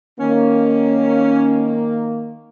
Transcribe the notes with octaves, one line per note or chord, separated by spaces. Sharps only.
D#3 A#3 C#4